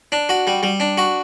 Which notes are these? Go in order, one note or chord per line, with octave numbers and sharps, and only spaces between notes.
D4
F#4
G3
G3
D4
F#4